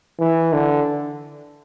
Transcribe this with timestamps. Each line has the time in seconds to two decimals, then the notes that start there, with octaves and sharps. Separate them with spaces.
0.20 E3
0.53 D3